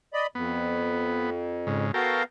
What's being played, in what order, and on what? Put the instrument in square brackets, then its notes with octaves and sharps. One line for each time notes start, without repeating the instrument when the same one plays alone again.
[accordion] D5 D#5 B5
[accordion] F2 [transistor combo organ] B3
[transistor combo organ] G#2 C#3
[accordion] B3 F#4 F5 [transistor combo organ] A4 A#4 G5